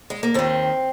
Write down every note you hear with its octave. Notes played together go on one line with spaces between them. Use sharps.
G#3
A#3
D#2 D#3 C4